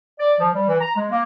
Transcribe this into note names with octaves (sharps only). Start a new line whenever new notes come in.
D5
F3
G3
E3
A#5
G#3
A#3